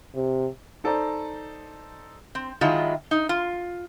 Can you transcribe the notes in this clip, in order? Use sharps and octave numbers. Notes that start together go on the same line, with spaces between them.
C3
D#4 A4 C5 D5 A#5
C4
D#3 F#3 G#3 E4 F4
D#4
F4